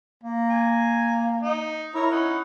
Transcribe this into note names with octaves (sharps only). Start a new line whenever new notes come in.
A#3
G#5
D#4
E4 A#4 C#5 A#5
C#4 D#4 F#5